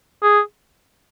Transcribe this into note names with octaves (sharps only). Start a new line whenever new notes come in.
G#4